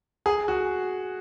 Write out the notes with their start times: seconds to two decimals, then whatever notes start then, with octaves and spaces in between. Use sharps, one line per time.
0.26 G#4
0.48 F#4